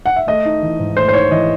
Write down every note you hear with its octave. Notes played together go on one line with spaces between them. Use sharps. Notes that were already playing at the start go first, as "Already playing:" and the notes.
F#5
E5
A3 D#5
D#4
E3
G#2
A3 C5
C5
D#4 C#5
E3 D#5